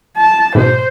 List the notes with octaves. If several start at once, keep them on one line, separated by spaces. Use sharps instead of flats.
A5
G#2 B2 C5